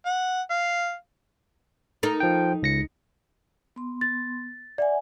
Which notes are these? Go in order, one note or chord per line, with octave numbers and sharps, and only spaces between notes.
F#5
F5
D#4 A4 A#4
F3 G5
C#2 A#6 C#7
B3 C6
A6
D5 E5 F#5 G#5